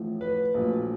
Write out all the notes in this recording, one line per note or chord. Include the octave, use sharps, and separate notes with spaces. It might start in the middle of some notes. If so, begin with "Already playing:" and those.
Already playing: A1 A2 F3 A3
B4
A#1 A#2 F#3 A3